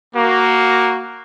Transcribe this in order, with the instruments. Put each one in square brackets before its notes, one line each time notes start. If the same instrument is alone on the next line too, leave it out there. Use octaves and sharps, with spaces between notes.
[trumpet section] A#3 F#4